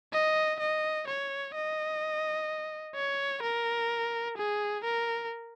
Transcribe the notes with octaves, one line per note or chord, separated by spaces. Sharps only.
D#5
D#5
C#5
D#5
C#5
A#4
G#4
A#4